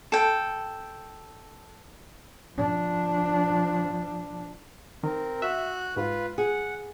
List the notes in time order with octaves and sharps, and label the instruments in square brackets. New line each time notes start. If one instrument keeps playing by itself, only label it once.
[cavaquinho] A4 G5
[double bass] F3 D4
[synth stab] D#3 [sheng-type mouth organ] C4 A#4
[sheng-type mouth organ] F#4 F#6 [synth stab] E5
[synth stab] G#2 [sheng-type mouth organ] F4 B4
[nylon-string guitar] G#4 [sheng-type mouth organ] F#5